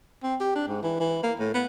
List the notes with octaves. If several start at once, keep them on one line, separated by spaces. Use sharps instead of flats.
C4
G4
D4
G#2
E3
E3
A#3
A2
B3